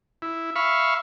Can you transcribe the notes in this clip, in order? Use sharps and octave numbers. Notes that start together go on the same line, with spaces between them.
E4
E5 F5 B5 C#6